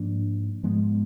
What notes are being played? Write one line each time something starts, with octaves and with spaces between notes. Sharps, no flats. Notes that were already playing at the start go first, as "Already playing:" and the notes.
Already playing: G#2 F3 A#3 D4
G#2 F3 G#3 B3